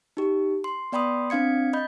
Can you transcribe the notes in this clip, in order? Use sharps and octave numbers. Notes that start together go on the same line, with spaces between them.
D#4 G4
C6
B3 D5 G5 B5 C6 D#6
C4 D4 F5 G#6 C#7
D#5 B5 G6